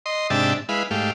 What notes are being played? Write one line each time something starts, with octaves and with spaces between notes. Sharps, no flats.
D#5 C6
G#2 C3 D4 G4 E5 A5
G#3 E4 B4 F5
G#2 A3 G4 F5